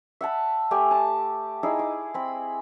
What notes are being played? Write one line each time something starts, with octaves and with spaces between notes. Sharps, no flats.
E5 F#5 A5 B5
A3 G4 G#5
A5
D#4 E4 G#4
D6
C4 B5